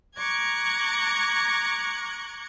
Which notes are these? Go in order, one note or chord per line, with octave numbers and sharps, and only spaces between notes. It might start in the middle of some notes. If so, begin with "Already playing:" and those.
A#5 C#6 D6 F#6 G#6